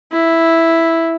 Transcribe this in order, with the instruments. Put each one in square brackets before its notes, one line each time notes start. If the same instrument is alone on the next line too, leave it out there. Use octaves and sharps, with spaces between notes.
[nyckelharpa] E4